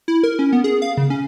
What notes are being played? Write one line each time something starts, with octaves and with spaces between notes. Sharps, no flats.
E4
A#4
C#4
B3
G#4
F5
C#3
C#4